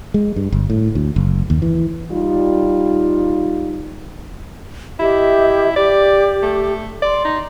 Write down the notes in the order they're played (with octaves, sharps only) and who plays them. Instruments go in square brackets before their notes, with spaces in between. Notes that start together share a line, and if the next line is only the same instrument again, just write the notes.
[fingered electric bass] G#3
G2
G1
A2
D2
F#1
D#2
E3
[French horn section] G3 D#4 F4
[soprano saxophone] E4 [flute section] G4 D#5 E5
[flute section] G4 [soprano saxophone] D5
[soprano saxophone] A3
[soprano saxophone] D5 [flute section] C6
[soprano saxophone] D#4